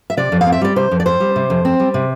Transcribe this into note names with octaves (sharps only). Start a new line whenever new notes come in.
E5
C3 D5
F2
F5
C4
E5
G3 D5
C3 C5
F2
D5
C4 C5
G3
C3
F2
C4
G3
C3